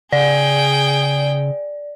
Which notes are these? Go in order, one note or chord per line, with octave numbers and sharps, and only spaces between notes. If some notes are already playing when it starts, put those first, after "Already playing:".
C#3 G#4 D5 G5